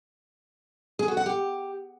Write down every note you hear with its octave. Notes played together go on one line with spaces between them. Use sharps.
G#4
F#4
F#5
G4